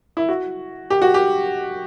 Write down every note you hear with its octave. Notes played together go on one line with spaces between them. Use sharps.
E4
F#4
G4
F#4
G4